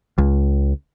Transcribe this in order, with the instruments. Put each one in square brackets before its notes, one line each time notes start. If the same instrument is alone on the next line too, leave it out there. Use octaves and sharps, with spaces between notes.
[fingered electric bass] C#2